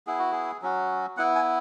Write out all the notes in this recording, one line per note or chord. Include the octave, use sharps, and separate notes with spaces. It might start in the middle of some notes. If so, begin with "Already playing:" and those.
B3 E4 G#4
F#4
G#4
F#3 C#4 F#4
B3 E4 F#5
G#5